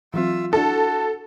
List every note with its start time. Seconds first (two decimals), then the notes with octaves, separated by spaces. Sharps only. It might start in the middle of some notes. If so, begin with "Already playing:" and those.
0.14 E3 F#3 C4 F4 E5
0.53 D4 E4 F#4 A4 A5